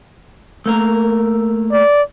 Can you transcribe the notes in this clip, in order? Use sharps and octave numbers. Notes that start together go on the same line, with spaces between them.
A3 A#3 A#4
D5